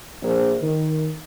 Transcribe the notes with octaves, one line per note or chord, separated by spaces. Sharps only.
A#1
D#3